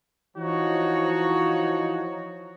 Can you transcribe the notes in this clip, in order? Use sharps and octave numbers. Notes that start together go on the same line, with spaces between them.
E3 F3 D#4 F#4 C#5